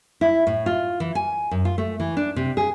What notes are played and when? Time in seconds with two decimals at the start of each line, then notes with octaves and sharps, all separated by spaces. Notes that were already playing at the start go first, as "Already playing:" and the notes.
0.21 E4
0.47 A2
0.66 F4
1.00 E3
1.15 G#5
1.51 F#2
1.65 F4
1.78 A3
2.00 E3
2.17 D4
2.36 C3
2.57 G#4